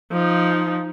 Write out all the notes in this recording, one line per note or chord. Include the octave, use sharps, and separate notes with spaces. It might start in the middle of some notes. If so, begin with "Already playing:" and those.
F3 D#4